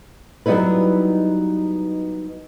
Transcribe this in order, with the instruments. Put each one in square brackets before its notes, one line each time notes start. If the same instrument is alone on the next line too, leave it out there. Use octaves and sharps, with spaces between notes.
[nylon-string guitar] F#3 G3 B3 D#4 E4 B4